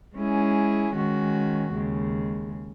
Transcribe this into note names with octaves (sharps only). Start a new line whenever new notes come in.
G#3 C#4 E4 G#4
D#3 G#3 C#4 F#4
D#2 C#3 G#3